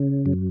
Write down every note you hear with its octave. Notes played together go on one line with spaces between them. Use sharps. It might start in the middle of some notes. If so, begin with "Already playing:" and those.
Already playing: C#3
F#2